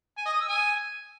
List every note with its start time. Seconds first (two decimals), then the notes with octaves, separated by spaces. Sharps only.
0.18 G#5
0.25 D#5
0.33 D#6
0.41 E6
0.49 G#5